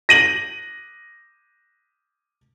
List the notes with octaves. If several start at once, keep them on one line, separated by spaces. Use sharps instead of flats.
A#6 D#7 F#7